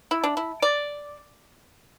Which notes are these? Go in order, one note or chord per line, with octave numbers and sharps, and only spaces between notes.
E4
D4
E4
D5